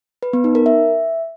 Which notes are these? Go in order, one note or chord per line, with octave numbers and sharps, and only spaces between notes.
B4
B3
D#4
A#4
E5